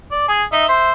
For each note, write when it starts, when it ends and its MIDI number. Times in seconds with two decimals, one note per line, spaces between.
0.12 0.28 74
0.28 0.44 68
0.53 0.64 63
0.53 0.64 75
0.53 0.64 76
0.69 0.92 72
0.69 0.92 76